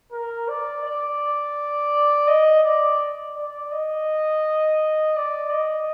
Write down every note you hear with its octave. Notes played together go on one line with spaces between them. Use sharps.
A#4
D5
D5
D#5
D5
D5
D#5
D5
D#5